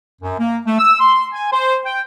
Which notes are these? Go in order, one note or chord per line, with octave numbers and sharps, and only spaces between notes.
F#2
A#3
A3
E6
C6
G#5
C5
G5